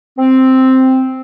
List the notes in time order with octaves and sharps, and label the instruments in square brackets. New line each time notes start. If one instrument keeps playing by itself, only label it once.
[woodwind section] C4